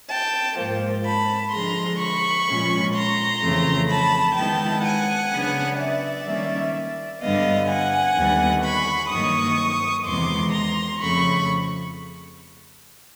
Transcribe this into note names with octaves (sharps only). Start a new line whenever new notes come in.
G5 A5
G#2 F3 A#3
A5 B5
D3 F3 G#3 A#5 C6
B5 C#6
A#2 F3 G#3 C#4 F4
A#5 C6
F2 C#3 E3 A3
A5 B5
D#3 G#3 B3 E4 G5 A5
F#5 G#5
C#3 F#3 B3 D4
D5 E5
D#3 G3 A#3 C#4
G2 D3 G3 B3 D#5 F5
F#5 G#5
D#2 D3 G3 B3
B5 C#6
G2 D#3 F#3 A#3 C#6 D#6
E2 C3 D#3 G#3 B3 C6 D6
A#5 C6
F2 C#3 F3 A3 B5 C#6